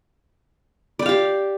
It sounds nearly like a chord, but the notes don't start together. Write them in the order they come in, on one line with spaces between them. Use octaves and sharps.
D5 G5 F5 G4